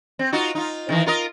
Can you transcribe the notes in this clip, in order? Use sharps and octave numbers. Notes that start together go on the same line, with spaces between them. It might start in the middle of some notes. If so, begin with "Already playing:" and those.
C4
D#4 F4 F#4
D#4 F4
C3 D#3 E3
F4 A#4 D#5